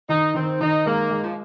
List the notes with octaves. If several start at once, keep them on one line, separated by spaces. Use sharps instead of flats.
D#3 D#4
D#3 C4
D#3 D#4
G#3 A#3
G#3
F3